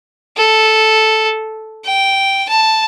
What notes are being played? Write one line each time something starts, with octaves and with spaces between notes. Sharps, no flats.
A4
G5
A5